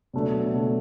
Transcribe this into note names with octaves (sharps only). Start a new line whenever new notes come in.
B2 F#3 A3 D4
B2 F#3 A3 D4